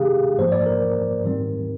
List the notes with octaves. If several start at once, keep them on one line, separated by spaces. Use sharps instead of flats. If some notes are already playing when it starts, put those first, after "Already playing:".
Already playing: C3 D#3 G#3 D4 G4 G#4 F5
G#2 F3 A#3 C5
D5
A#4
G#2 D#3 G3 C4